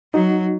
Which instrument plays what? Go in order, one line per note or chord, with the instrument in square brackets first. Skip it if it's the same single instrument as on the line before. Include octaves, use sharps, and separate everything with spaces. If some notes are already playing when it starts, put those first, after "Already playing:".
[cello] F#3 [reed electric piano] D#4 F#4